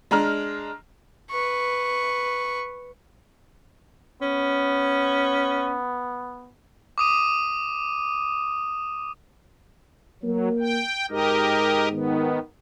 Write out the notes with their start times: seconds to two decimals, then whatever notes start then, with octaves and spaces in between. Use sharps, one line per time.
0.11 G#3 D4 A#5 F6
1.30 B4 C#6
4.22 B3 C#4
6.98 D6 D#6 D#7
10.23 F#3 A#3
10.59 G5
11.10 G#2 G4 A#4 D#5
11.91 D#3 B3